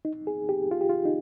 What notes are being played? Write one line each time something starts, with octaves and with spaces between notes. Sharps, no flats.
D#4
G#4
G4
F4
G4
F4
D#4